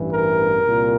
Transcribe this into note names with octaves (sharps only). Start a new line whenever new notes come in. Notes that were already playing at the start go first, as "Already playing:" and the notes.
Already playing: A1 G2 E3
A#4
C2 A#2